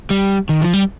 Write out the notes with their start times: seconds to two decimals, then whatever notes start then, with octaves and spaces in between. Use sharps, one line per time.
0.10 G3
0.49 D#3
0.62 F3
0.73 G3